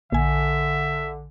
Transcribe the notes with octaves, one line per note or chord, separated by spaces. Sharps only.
A#1 D3 E5 G#5